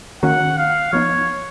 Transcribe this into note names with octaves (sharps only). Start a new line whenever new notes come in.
D#3 A#3 C#4 F#4 F#5
F5
F3 B3 D#4 C#5